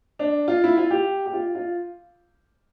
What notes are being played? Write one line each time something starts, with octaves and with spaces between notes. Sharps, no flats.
D4
F4
E4
F4
G4
G4
F4
F4